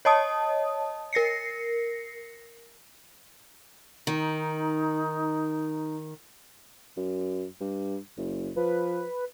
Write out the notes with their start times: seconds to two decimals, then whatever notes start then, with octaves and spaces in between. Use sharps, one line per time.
0.05 C#5 D#5 A5 D#6
1.13 A#4 A#6 C7 C#7
4.07 D#3 D#4
6.97 F#2
7.60 G2
8.17 F#1
8.56 F3 B4